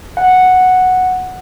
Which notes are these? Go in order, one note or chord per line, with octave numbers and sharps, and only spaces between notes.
F#5